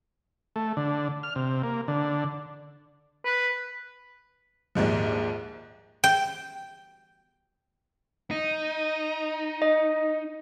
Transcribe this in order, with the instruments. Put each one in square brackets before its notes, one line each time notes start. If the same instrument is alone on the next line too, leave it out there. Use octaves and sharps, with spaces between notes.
[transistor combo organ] A3
D3
F6
C3
A#3
D3
[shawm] B4
[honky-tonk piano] A#1 D#2 G#2 F3
[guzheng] G5
[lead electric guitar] D#4
[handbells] D#5